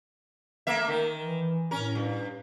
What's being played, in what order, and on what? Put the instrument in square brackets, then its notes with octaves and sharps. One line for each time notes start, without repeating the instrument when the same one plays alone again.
[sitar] A3 A#3 E5
[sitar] D#3 [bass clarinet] A#4
[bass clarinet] E3
[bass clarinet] A2 [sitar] C#4 A#4
[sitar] G2